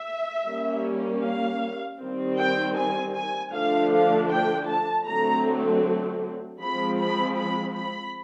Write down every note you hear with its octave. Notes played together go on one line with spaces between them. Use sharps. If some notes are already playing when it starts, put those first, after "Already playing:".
Already playing: E5
G3 A#3 C#4
F5
D#3 G3 C4
G5
G#5
G#5
D3 F3 A3 D4 F5
F5
G5
A5
D3 F#3 A3 C4 A#5
F3 G#3 C4 B5
B5
B5
B5